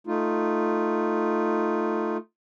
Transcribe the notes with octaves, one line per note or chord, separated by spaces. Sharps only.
A3 D#4 F4